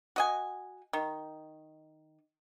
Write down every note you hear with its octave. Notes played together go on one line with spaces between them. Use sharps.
F#4 D#5 G#5
D#3